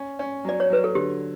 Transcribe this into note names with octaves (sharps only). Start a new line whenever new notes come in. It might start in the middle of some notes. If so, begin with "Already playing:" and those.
Already playing: C#4
C#4
F#3 D5
C#5
F#3 B4
A4
D3 G4